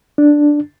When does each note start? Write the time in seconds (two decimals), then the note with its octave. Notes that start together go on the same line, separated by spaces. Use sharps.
0.18 D4